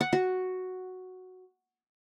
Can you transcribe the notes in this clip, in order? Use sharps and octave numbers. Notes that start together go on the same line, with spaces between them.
F#5
F#4